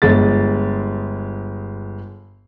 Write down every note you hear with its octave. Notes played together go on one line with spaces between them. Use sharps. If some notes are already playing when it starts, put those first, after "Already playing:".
G1 G#3 A6